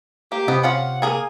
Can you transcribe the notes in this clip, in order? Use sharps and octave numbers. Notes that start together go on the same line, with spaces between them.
A#3 G4
C3 B3 C4 D#5
C#4 F4 F5 F#5
A#3 G#4 A#4 G#5